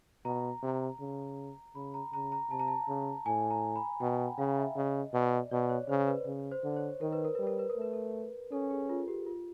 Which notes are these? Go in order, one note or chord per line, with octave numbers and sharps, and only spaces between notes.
B2 A#5
C3
C#3
C#3 B5
A#5
C#3 A#5
A#5
C3 A5
A#5
A5
C#3
A2 G#5
A#5
B5
B2 G5
F#5
C#3 F5
E5
C#3 D#5
B2 D5
B2 D5
C#5
C#3 C5
B4
C#3
C5
D3
C#5
D#3 A#4
B4
A#4
G3 B4
A#4
B4
A#4
A3 B4
A#4
C#4 A4
G#4
F4
G4
F4